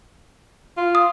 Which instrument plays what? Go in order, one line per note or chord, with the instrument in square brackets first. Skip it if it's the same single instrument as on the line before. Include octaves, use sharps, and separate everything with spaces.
[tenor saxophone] F4
[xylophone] D#6